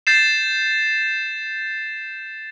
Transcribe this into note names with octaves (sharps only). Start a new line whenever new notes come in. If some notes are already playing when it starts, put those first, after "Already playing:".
G6 A6 C7 E7